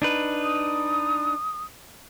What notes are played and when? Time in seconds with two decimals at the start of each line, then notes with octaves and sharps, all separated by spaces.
0.02 D4 D#4 B4
0.43 D#6